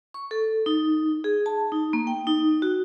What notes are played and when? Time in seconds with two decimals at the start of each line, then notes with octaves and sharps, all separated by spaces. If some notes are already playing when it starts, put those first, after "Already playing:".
0.14 C#6
0.31 A4
0.66 D#4
1.24 G#4
1.46 A5
1.72 D#4
1.93 A#3
2.07 G5
2.27 D#4
2.62 F#4